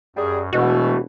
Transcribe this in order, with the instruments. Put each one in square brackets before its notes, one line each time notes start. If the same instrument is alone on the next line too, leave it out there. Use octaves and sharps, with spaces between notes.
[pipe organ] F#2 [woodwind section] G3 G#4
[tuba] E1 [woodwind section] B2 [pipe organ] E3 A3 [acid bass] F#4